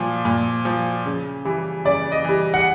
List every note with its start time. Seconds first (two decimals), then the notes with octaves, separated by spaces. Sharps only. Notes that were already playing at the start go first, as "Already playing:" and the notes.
Already playing: A#2 F3
0.25 A#2
0.65 F3
1.06 C#3
1.45 E3 G3
1.85 C#3 D5
2.12 D#5
2.24 E3 G3
2.54 F#5